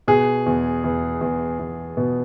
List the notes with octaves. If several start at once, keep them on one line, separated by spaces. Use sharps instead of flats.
B2 G#4
E2
E2
E2
E2
B2